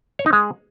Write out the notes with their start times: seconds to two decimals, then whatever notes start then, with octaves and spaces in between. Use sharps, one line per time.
0.19 C#5
0.26 D#4
0.33 G#3